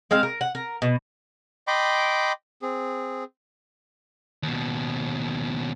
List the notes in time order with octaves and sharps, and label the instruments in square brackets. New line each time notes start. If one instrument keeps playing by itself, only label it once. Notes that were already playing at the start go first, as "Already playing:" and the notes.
[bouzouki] G#3 C4 F5
A#4
F#5
A#4
B2
[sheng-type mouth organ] D#5 G5 B5 C6 D6
C4 G#4
[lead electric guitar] D#2 B2